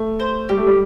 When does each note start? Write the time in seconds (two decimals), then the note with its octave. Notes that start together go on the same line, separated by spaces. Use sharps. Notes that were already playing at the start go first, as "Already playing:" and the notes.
Already playing: A3
0.20 C5
0.49 G3 G4
0.57 A3
0.67 G3